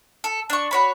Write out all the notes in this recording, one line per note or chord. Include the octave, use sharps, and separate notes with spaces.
A4
D4 C#6
F#4 C#5 B5